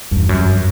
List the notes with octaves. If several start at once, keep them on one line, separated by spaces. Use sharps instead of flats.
E2 G2
F#2
G2